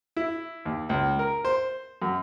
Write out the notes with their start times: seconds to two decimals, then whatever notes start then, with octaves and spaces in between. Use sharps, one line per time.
0.17 E4
0.66 D#2
0.89 C#2
1.19 A#4
1.45 C5
2.02 F#2